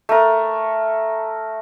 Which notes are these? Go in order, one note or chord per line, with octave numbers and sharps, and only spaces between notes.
A3 A#4